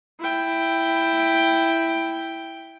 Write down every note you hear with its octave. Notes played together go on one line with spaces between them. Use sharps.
E4 G5